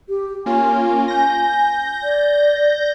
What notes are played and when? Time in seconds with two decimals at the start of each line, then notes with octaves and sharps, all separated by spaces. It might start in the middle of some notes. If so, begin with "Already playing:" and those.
0.09 G4
0.46 A#3 C#4 F4 G#5
1.08 G6 A#6
2.03 D5